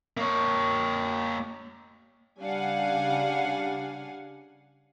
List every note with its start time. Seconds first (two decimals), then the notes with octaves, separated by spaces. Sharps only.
0.17 A#3 C#5
2.40 C#3 G3 D4 F5 F#5 G#5